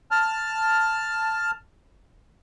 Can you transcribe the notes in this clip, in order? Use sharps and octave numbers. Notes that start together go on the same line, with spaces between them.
A5 F6